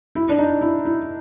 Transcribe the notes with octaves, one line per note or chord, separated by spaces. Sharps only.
E4
D4
D#4
E4
E4